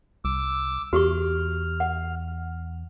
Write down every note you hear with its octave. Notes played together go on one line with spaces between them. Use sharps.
C2 D6 E6
E2 F#4 G4 C#6 F6
F#5